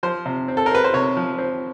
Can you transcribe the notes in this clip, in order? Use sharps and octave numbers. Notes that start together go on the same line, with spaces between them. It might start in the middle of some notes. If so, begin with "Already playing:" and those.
F3 C5
C3
C4
A4
A#4
C4 B4
C5
C3 C#5
F3
C4